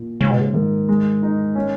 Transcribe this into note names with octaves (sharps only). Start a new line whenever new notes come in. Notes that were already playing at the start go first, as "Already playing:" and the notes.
Already playing: A#2
G#2 C#3
B2
C#3
G#2 D#3
G#3
D#4
C#4